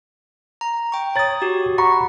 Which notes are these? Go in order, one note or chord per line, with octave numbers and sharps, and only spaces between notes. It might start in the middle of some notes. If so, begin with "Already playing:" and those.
A#5
G5 C#6
C#5 A#5 D#6 A6
F#4 G4
F#5 A#5 B5 C#6